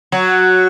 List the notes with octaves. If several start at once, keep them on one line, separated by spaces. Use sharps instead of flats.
F#3